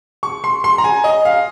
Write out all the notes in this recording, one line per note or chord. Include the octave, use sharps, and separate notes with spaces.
C#6
C6
C6
A#5
G#5
D#5
F5